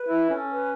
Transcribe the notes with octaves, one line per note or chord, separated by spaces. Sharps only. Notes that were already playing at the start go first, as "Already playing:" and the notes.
Already playing: B4
E4
C#4 A4
B4